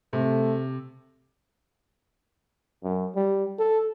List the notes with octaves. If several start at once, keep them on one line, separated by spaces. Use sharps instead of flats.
C3 A3
F#2
G3
A4